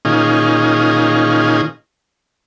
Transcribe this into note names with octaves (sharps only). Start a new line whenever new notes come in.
A#2 D#3 C#4 D#4 F4 G#4